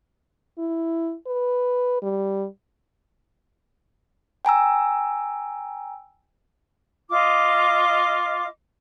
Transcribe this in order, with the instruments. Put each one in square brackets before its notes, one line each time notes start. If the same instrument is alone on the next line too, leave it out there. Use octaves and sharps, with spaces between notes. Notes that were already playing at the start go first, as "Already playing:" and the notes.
[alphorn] E4
B4
G3
[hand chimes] G5 G#5 A#5 E6
[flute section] F4 D#5 D6